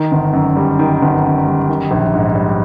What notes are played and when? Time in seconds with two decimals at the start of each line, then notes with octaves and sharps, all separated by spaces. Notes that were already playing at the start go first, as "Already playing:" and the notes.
Already playing: D#3
0.12 G1
0.33 F#2
0.57 G3
0.79 D#3
1.02 G1
1.23 F#2
1.46 G3
1.69 D#3
1.91 A#1
2.14 G#2
2.35 G3